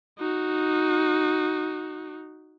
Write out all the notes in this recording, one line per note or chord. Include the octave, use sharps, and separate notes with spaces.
D#4 F#4